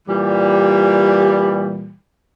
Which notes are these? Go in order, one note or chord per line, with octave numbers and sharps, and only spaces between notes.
A#2 E3 G3